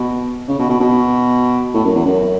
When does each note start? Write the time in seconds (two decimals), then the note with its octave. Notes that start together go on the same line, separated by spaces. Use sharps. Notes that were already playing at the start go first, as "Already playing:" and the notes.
Already playing: B2
0.48 C#3
0.59 B2
0.69 B2
0.80 B2
1.74 A2
1.84 F#2
1.95 E2
2.05 F#2